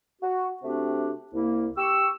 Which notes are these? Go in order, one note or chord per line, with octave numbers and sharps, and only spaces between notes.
F#4
C3 A3 C4 D4 F#4 G4
C2 A#3 E4
G4 C#6 E6